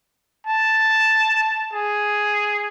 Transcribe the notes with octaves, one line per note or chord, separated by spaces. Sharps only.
A5
G#4